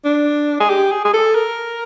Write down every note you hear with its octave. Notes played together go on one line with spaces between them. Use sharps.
D4
G#4
G4
G#4
G#4
A4
A#4